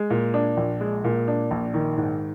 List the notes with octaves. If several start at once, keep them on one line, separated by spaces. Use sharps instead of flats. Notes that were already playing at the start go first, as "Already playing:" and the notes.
Already playing: G#3
A#2
D4
A#1
G#3
A#2
D4
A#1
D#3
G#2